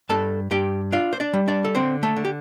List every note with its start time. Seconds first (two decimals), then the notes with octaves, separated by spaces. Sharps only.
0.09 G2 A4 A5
0.51 G2 G4 G5
0.92 D4 F4 F5
1.13 C5
1.20 D4 D5
1.33 G3
1.48 D4 D5
1.65 A4
1.75 D3 C4 C5
2.03 A3 A4
2.16 D3
2.25 G4